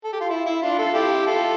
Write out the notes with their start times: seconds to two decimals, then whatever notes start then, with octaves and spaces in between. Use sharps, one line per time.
0.04 A4
0.12 G4
0.21 F4
0.30 E4
0.46 E4
0.62 D4 F4
0.78 F4 A4
0.94 E4 G4
1.27 F4 A4